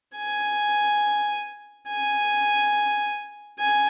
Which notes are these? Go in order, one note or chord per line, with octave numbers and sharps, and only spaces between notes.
G#5
G#5
G#5